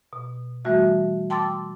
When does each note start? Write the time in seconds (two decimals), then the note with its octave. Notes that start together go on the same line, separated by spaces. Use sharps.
0.13 B2
0.65 E3 G3 A3 F#4 E5
1.30 G5 A5 C6 D6 E6 A6